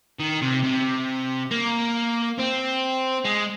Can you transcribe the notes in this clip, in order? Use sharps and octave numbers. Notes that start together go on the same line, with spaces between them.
D#3
C3
C3
A#3
C4
G#3